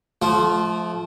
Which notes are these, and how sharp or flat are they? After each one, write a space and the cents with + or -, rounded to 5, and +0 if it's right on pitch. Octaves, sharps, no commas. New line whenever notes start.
F3 +0 A3 -35 F4 +0